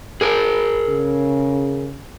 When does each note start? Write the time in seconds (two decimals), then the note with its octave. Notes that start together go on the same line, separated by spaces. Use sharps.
0.21 G#4 A#4
0.89 C#3